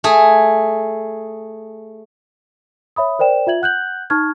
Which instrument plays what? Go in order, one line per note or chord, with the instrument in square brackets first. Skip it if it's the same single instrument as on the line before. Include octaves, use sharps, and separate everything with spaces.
[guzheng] A3 G#4
[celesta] C#5 E5 B5 D#6
A#4 C5 D5 G5 E7
F4 E5 G#6 F#7
F#5 F#6 G6 F#7
D#4 A5 C#6 F6 G#6